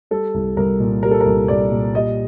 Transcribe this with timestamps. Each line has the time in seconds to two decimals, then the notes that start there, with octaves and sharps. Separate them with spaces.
0.11 G3 A4
0.34 C2
0.57 C2 A#4
0.80 A#2
1.03 G3 A#4
1.11 A4
1.21 A#4
1.25 C2
1.48 C2 D5
1.72 A#2
1.95 G3 D#5